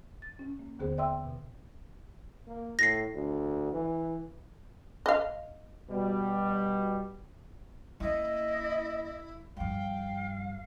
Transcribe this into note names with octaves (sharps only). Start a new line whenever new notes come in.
A6
C#4
A#3
D#2 D3 B3 G#4 C5
D5 E5 G5 C6 E6
B2
A#3
A2 A#6 C7
D2
E3
D#5 F5
B2 G3
A#3 C#4 E4 D#5
G2 F3 F5 G5